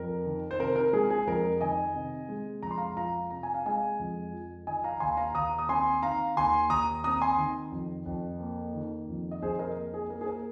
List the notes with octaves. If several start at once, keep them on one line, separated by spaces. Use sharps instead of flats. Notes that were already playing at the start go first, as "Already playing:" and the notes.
Already playing: F2 A#4
D#3
C5
C3 A#4
A#4
G#3 G#4
G#4
F2 A#4
D#3 D#5 G#5
C3
G#3
F2 A#5
C6
F5 A#5
F3 F5 A#5
C3 A#5
G#5
F5
G#3 D#5 G#5
F2
F3
D#3 D#5 G#5
F5 A#5
D#2 G#5 C6
F5 A#5
D#2 A#5 D#6
D#6
C4 G#5 C6
D#3 F5 A#5
D#2 G#5 C6
D#2 A#5 D#6
C4 A#5 D#6
G#5 C6
D#3
F2
F2
A#3
D#3
F2
D#5
F2 G#4 C5
A#4 D#5
A#3
G#4
A#3 A#4
G#4
A#4